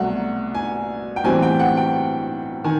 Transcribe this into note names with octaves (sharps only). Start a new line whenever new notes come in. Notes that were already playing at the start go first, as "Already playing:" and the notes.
Already playing: C2 B2 F#3 A3 F#5
G#5
G5
B1 A2 E3 G3 C4 G#5
G5
F#5
G5
D#3 G#5